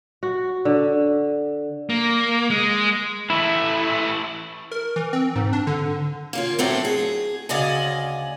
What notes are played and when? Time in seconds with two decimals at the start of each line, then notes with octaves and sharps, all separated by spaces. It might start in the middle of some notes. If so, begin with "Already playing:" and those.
0.23 F#4
0.65 D3
1.89 A#3
2.50 G#3
3.30 E3 A3 E4
4.71 A#4
4.96 E3
5.13 C4
5.36 G#2
5.53 D4
5.67 D3
6.33 A#3 C#4 F4
6.59 A2 F#3 A3 C4 D4
6.85 G#4
7.49 D2 C#3 D5 D#5 G#5